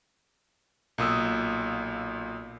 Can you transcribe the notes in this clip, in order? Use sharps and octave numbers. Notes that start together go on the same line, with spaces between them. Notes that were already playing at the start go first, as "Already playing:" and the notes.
B1 A#2 D#6 E6